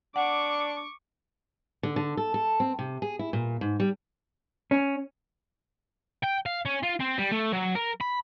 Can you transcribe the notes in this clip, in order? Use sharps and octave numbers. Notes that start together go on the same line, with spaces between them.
D4 F#5 C#6 D6
D3
D3
A4
A4
C4
C3
G#4
E4
A#2
G#2
G3
C#4
G5
F5
C#4
F4
C4
G3
A3
F#3
A#4
B5